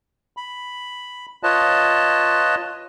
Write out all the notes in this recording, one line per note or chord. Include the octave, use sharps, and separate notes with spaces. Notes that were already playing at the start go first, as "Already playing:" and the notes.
B5
F4 B4 C#5 D#5 A5